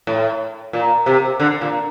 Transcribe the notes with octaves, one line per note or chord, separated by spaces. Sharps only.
A2
A#2
C3
D3
A#2